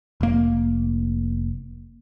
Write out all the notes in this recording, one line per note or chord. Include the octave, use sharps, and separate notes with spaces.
F1 A#3